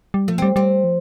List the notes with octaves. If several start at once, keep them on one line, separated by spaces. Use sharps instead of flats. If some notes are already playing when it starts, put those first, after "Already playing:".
G3
F3 A3
C4
G3
G3 C4
F3